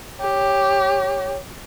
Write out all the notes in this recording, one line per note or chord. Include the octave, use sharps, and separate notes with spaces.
G4 C#5